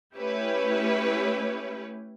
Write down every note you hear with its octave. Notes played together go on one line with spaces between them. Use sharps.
A3 C#4 E4 G4 B4 C#5